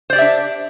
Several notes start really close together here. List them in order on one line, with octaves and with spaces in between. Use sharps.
C5 D5 G4 E5 D4